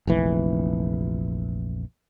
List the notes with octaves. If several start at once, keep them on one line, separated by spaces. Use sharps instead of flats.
F1 A#1 E3